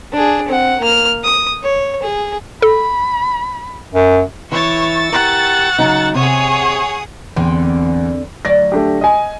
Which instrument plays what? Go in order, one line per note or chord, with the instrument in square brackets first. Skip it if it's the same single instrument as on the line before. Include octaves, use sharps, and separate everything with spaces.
[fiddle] D4 G#4
C4 F#5
A#3 F6
D#6
C#5
G#4
[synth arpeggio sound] A4 [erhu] B5
[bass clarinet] F#2
[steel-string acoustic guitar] E3 E4 [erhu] C#5 [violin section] C#6 E6 A6
[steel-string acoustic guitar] G4 A#4 [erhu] F#5
[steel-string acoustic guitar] C#3 F#3 D#4
[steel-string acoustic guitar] C3 [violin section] G#4 F#5 D#6 [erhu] C#5
[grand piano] E2 [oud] D3 C4
[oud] D2 F#3 D5 [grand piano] A#6
[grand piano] A3 D4 G4
D#5 G#5